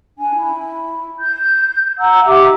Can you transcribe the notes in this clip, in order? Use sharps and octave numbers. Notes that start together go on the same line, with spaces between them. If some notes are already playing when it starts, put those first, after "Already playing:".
D4 G#5
E4
G6
F#5 A#5 E6
D#4 G4 E5 D6